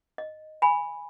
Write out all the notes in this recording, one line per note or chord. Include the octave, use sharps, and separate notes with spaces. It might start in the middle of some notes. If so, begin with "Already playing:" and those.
D#5
G#5 B5